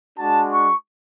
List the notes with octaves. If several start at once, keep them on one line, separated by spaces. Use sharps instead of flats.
G#3 D4 F#4 A5
C#6